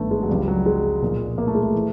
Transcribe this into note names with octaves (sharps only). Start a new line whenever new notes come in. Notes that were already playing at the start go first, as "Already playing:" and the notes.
Already playing: G1 F#2 D#3 A3 B3 D4
G#3
F#3
C#2 C#3 F3 G3
F#3
G#3
B1 A#2 F3
A#3
A3
G#3
A3
E3